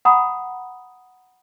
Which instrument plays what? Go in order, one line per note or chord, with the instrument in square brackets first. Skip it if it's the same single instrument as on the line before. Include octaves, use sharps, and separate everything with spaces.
[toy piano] F#5 A#5 B5 D#6